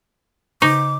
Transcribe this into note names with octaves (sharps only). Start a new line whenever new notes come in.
C#3 D#4 D6